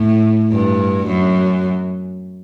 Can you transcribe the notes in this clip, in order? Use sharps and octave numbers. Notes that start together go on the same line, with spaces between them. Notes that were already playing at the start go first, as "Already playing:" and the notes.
Already playing: A2
G2
F#2